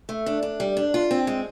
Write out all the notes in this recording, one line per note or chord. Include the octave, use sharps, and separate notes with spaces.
A3
D4
D4
G3
D4
F4
C4
G#3